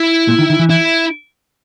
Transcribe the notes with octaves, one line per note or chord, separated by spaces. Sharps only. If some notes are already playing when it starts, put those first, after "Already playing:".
Already playing: E4
A#2
D#3
D#3
E3
E4